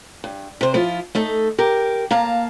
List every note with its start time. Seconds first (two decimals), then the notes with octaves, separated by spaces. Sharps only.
0.24 G2
0.61 C3 C5
0.74 F3 E4 F4
1.15 A3 D#4 A4
1.58 G4 A#4
2.11 A#3 F5 A5 A#5